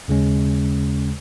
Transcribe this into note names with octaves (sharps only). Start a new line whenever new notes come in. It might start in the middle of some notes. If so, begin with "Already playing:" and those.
D#2 C#3 G#3 C#4